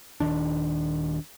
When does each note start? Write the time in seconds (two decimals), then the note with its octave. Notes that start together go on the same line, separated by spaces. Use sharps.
0.20 D#1 B1 D#3 D4